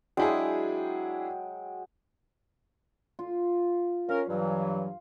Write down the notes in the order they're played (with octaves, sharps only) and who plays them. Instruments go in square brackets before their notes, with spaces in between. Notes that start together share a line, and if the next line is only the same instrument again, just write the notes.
[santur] F#3 G#3 G5 [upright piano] D4 E4 G#4
[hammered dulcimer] F4
[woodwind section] C#4 A#4 [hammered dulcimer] F5
[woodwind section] G2 E3 F#3